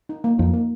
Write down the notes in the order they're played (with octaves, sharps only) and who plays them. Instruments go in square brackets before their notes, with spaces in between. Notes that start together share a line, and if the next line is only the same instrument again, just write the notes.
[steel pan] D#4
A#3
[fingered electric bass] F2 [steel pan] D#4
[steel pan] A#3